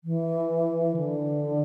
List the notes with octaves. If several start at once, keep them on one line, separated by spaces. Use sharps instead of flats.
E3
D3